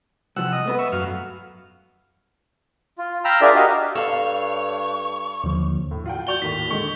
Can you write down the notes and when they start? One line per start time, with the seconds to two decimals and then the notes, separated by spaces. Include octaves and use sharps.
0.36 C2 F3 F#5 E6
0.53 D#5
0.66 A3 B3 B4
0.79 E5 C#6
0.92 F#2 F5
2.98 F4
3.25 F5 G5 A#5 B5 E6 F6
3.41 D4 F4 G#4 A#4 D5 E5
3.55 F#4 G4 A#4 D#5 F5
3.95 G2 A4 C#5 F5
5.44 D#2 D3 F3
5.91 A2
6.06 F4 F#5 G5
6.27 F#4 D5 C#6 G6 F7 G7
6.42 D#2 A2 B6
6.71 D3 G#3 C#6